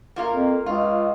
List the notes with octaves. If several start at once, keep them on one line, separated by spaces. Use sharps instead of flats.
A#3 F4 A#4
F2
C#2 F4